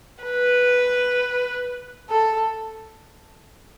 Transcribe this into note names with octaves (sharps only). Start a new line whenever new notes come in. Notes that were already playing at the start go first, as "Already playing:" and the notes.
B4
A4